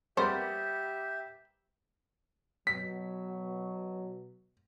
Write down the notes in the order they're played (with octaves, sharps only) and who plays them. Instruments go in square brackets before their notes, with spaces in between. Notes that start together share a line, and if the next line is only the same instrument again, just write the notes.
[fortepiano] G3 A#3 B3 [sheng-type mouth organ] G4 E5 [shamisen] C5
[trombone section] B2 F#3 [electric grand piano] B6